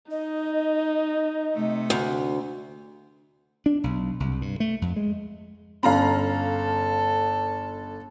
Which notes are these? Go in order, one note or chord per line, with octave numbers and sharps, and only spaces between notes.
D#4 D#5
C3 A3
D2
D4
B1
C2
G2
A3
F2
G#3
G1 C#4 A4 F5 A#5 B5